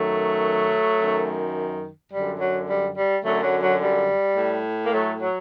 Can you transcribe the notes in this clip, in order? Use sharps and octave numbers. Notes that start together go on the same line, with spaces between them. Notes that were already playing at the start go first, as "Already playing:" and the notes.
Already playing: F#2 D#3 F#3 A3
F#2 D#3
F#2 D3 G3
F#3
G3
G3
F#2 D3 F#3 A3
F#3
F#3
G3
A2
A#3
F#3 A3
F#3